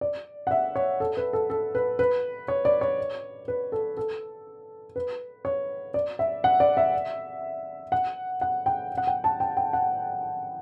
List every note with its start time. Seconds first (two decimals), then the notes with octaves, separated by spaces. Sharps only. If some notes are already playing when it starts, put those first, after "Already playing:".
0.01 D5
0.47 F#5
0.51 E5
0.76 C#5
1.00 A4
1.17 B4
1.33 A4
1.50 A4
1.75 B4
1.99 B4
2.48 C#5
2.65 D5
2.81 C#5
3.48 B4
3.72 A4
3.97 A4
4.96 B4
5.45 C#5
5.94 D5
6.19 E5
6.44 F#5
6.60 D5
6.77 E5
7.92 F#5
8.41 F#5
8.66 G5
8.98 F#5
9.07 G5
9.24 A5
9.40 G5
9.57 G5
9.73 F#5